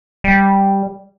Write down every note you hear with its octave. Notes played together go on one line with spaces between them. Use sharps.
G3